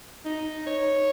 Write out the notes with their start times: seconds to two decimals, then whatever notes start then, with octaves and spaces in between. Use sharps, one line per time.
0.25 D#4
0.67 C#5